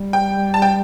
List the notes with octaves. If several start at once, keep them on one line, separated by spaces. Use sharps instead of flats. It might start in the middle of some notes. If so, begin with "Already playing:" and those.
Already playing: G3
G5
A5
G5